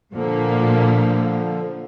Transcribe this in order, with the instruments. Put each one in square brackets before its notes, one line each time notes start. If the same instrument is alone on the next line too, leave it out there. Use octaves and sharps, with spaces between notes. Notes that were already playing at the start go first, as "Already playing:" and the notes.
[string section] A#2 A#3 [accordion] D3 F3